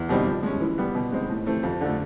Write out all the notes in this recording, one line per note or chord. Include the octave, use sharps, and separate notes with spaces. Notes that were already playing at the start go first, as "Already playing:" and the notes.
Already playing: E2
B2 G3 C4 D#4
F3
G#3 C#4
E3
G3 B3
B2
G#3 C4 D#4
A2
E3 A3 C4
F2
D3 F3 A3